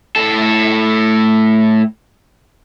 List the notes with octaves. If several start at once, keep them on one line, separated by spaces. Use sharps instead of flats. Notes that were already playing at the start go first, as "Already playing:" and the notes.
A2 A4